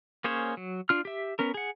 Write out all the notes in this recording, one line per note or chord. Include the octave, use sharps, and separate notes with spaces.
A#3 C#4 G#4 C5 C#5
F#3
D4 F4 F6
G4 E5
B3 C#4 A#4
G#4 F#5